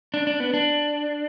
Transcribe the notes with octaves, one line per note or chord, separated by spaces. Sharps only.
D4
D4
B3
D4